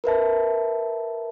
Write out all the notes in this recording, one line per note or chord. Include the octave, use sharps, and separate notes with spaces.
A#4 B4 E5 A5